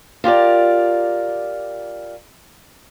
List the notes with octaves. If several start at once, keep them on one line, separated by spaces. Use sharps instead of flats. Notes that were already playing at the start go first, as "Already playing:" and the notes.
F4 G4 A#4 D5